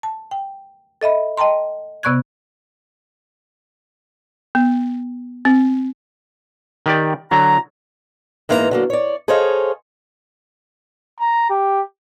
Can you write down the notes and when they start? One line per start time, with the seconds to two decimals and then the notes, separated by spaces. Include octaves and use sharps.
0.03 A5
0.31 G5
1.01 A4 D#5 E5 B5
1.37 D#5 G5 A5 A#5 C6
2.03 C3 B3 D5 C#6 F#6 G#6
4.55 B3
5.45 C4
6.86 D#3 G4 D5
7.31 D3 F#3 A#5
8.49 G#2 E3 A#3 D#4 A4 A#5
8.71 D3 F#3 A#3
8.90 C#5 D5
9.28 G#4 A4 C5 C#5 D#5 F5
11.19 A#5
11.50 G4